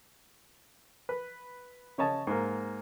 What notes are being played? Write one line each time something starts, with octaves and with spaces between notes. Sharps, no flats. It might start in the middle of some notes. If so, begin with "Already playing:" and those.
B4
C#3 C#5 D#5 A5
G#2 A#3